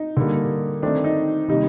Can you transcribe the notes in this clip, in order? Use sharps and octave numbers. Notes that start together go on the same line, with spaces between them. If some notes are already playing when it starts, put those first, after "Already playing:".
Already playing: D#4
D3 G3 A#3
D#3 A3 C4 D4
D#4
C3 D#3 G3 A#3 D#4